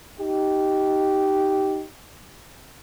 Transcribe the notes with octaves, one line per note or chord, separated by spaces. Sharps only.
D#4 G4